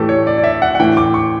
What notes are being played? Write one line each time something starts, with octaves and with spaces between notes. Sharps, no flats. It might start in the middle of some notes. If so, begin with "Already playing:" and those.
Already playing: A2 E3 G4 A4
C#5
D5
D5
E5
F#5
F#5
A2 E3 G5
D6
C#6